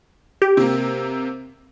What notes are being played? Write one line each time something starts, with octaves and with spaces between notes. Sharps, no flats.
G4
C3 A#3